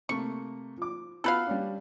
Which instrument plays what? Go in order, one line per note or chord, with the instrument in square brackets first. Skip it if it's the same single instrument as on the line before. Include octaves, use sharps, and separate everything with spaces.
[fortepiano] C3 A3 A#3 [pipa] C#6
[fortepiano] F3 D6
[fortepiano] B3 F4 F#4 [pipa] A4 B4 F5
[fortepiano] G3 C#4 D4